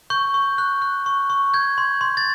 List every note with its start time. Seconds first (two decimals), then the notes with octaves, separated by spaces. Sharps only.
0.10 C#6 G6
0.34 C#6
0.58 F#6
0.82 F#6
1.06 C#6
1.30 C#6
1.54 G6 G#6
1.78 C6
2.01 C6
2.17 A6